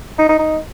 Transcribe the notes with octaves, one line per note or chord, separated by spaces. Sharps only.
D#4
D#4
D#4